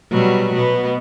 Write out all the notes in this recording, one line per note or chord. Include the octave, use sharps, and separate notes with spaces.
B2 F#3 G3
B2 B3